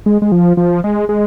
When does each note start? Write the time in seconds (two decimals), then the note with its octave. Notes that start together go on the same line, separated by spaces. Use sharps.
0.06 G#3
0.22 G#3
0.32 F3
0.57 F3
0.84 G#3
1.09 G#3